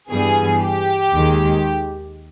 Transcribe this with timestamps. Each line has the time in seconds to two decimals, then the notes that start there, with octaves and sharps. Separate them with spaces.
0.11 G2 E3 G3 B3 G#4
0.62 G4
1.13 D#2 D#3 G#3